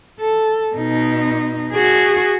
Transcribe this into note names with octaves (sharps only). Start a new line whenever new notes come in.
A4
B2 D#4
F#4 G#4